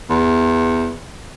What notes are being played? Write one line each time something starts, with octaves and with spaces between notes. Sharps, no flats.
E2